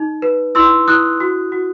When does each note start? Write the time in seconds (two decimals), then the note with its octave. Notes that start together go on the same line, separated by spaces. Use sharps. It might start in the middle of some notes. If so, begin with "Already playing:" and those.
Already playing: D#4
0.22 B4
0.55 E4 C6 E6
0.88 E4 D#6 F#6
1.20 F#4
1.52 F#4